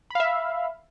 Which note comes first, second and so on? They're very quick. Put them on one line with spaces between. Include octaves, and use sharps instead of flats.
B5 F5 E5